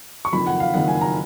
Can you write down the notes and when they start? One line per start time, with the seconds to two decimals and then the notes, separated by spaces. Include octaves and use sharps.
0.25 C#6
0.33 F#1 F2 D#3 B5
0.47 F#5
0.60 F5
0.74 F#1 F2 D#3 F#5
0.88 G#5
1.01 A#5